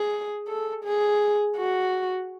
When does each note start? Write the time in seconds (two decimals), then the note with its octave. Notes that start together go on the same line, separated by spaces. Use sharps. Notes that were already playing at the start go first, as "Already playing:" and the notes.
Already playing: G#4
0.48 A4
0.84 G#4
1.57 F#4